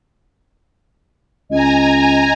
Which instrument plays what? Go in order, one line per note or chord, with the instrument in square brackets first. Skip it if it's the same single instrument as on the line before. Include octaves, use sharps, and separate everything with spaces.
[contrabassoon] C#2 [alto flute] D#5 [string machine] G#5 A#5